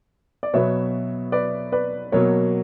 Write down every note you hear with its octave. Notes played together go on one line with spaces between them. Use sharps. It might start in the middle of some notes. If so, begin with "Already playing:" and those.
D5
B2 F#3 B3 C#5 E5
B4 D5
B4 D5
B2 F#3 A#3 A#4 C#5